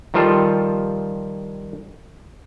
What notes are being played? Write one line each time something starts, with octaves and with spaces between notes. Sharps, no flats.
D#3 F3 G3 F4 A4